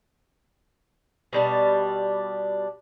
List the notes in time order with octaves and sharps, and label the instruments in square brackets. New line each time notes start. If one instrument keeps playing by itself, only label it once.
[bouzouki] B2 G3 D4